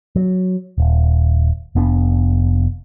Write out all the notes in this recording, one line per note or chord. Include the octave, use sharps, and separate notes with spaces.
F#3
D#1
F1 B3 D4